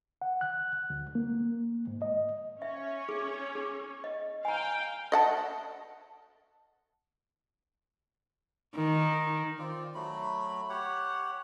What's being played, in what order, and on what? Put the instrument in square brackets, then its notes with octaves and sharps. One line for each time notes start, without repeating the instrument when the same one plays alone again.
[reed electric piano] F#5
F#6
D2
A#3
G#2
D#5
[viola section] C#4 C#5 [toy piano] E5
[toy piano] G#4
G#4
D#5
[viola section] F5 G5 [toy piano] G#5 A#5
[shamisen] D#5 F#5 A5
[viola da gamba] D#3
[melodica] C4 F4 D5
F#3 A3 B5
G4 C#5 F#5